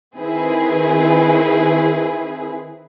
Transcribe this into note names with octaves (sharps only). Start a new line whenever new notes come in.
D#3 C4 E4 G#4 B4